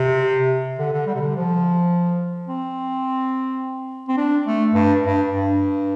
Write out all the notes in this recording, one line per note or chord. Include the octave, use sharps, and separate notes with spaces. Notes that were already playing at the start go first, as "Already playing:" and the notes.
Already playing: C3
D3
D3
G3
C3
D3
F3
C4
C4
D4
A3
G2
G2
G2